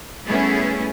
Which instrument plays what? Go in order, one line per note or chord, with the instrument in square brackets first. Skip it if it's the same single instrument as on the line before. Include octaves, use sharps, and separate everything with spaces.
[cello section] G3 A3 B3 C#4 E4 G#4